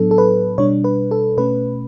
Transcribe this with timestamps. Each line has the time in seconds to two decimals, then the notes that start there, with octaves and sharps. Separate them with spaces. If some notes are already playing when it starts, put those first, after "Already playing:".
Already playing: A2 F#3 B3 D4 A4
0.11 A4
0.18 B4
0.58 B2 G3 D4 C#5
0.84 B4
1.11 A4
1.37 B2 A3 C#4 B4